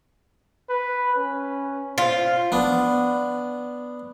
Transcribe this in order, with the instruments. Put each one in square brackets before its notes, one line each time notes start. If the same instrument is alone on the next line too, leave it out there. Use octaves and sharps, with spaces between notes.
[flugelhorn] B4
C#4
[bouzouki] F4 [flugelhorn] C5
[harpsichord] B3 D4